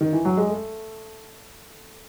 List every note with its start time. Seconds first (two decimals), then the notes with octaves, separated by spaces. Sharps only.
0.01 D#3
0.13 E3
0.25 F#3
0.37 G#3
0.50 A3